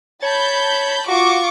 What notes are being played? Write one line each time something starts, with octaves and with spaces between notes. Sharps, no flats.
C#5 A5 B5 G6
F4 F#4 C#6 D6